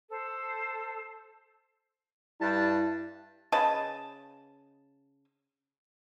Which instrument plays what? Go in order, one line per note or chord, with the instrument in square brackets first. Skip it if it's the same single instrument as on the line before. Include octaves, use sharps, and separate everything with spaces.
[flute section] A4 C5
[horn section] G2 G3 A5 [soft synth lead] E4
[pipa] C#3 B4 D#5 A5